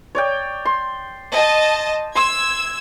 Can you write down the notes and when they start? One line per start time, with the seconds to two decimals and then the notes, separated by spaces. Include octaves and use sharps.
0.15 C#5 D5 G5
0.65 C6
1.32 D#5 A5
2.15 C6 E6 G#6